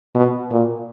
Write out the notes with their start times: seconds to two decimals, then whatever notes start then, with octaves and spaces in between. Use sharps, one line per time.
0.15 B2
0.51 A#2